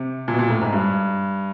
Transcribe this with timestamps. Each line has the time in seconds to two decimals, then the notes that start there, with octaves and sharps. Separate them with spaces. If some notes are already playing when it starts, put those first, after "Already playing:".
Already playing: C3
0.28 A#2
0.34 B2
0.39 A#2
0.50 A2
0.61 G#2
0.73 G2